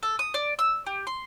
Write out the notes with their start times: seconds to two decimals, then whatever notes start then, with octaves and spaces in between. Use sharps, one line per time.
0.03 A4
0.19 D#6
0.34 D5
0.59 E6
0.86 G4
1.07 C6